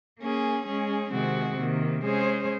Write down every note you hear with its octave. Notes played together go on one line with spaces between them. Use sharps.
A#3 C#4 G#4
G#3 C#4 G#4
C3 D#3 G#3 C4 F#4
C3 D#3 A#3
G#3 C#4 G#4 C5